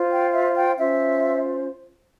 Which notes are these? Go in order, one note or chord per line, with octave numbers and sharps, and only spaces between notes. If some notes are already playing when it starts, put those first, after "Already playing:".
Already playing: F4 C5
G5
E5
G5
C#4 F4 C5 E5